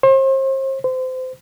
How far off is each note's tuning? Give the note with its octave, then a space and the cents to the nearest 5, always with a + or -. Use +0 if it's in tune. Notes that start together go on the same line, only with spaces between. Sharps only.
C5 +40
C5 -25